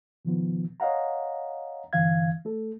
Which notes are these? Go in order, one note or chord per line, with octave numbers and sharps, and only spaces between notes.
B2 D#3 F3 B3
C#5 D#5 F5 F#5 A#5
G2 D3 E3 F5 G#6
A3 A4